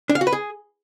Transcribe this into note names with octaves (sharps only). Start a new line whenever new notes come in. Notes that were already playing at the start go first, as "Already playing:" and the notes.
D4
F5
F#4
B4
G#4